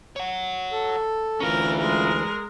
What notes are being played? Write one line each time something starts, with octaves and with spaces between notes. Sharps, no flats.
C#5 F#5
A4
D2 E3 C#4 F4 A#4
G#3 A#4